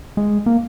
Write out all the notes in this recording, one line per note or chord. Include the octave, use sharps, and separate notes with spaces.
G#3
A#3